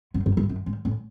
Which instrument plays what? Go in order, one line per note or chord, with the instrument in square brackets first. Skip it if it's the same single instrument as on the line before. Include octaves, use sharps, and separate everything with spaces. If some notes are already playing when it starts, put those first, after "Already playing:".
[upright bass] F#2
G2
G2
F#2
G#2
A2